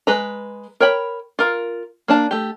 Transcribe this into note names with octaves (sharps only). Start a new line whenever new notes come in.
G#3 B4 A#5
A#4 C#5 G5 B5
F4 A#4
A#3 D4 A5
A3 G4